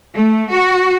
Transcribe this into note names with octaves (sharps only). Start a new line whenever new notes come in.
A3
F#4